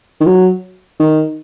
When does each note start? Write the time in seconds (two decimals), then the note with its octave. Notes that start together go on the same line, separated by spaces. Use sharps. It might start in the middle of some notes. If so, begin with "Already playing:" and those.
0.20 D#3
0.26 F#3
1.00 D#3